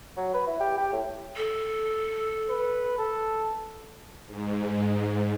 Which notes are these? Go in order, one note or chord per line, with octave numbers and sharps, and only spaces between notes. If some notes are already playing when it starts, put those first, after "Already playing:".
F#3
B4
E4
G4
G4
A2
A4
B4
A4
G#2